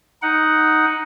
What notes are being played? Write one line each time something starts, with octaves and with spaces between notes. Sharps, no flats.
D#4 F#5